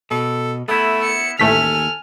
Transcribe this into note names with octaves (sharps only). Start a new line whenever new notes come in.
B2 A4
A3 B3 E4
C#7
A1 D#2 A3 A4 G#5 F6 B6